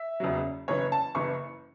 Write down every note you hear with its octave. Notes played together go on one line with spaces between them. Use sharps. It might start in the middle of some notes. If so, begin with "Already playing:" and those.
Already playing: E5
F#1 E2 C#3 F#3
F#1 F#2 E3 C#5
A5
F#1 F#2 E3 C#6